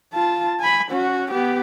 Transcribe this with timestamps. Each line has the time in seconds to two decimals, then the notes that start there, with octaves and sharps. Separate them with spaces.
0.14 F4 A5
0.60 G#5 B5
0.91 C#4 F#4
1.31 B3 G4